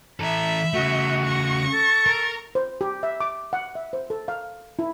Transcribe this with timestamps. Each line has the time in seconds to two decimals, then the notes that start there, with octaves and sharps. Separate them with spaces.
0.20 E3 A4 E5 A#5 B5
0.73 C#3 A3 F#4
1.24 C#6 A#6
1.71 A4
2.06 A#4
2.55 C5
2.81 G4
3.03 E5
3.20 D6
3.53 F#5
3.75 E5
3.93 C5
4.10 A4
4.28 F5
4.79 E4